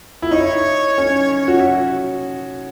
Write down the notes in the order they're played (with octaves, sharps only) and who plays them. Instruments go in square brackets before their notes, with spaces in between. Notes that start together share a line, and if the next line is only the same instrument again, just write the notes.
[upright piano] E4
[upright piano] D#4 [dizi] C#5
[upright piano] C#4
F#4
[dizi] E5